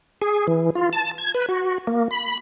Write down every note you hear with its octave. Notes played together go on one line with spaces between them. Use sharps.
G#4
E3
F4
A5
G#6
B4
F#4
A#3
B5